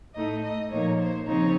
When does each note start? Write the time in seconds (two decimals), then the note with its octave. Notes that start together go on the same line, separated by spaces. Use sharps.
0.15 A2 A3 D#4 D#5
0.43 D#5
0.71 A#2 F3 A#3 D#4 C#5
0.99 C5
1.27 C#3 F3 C4 D#4 C#5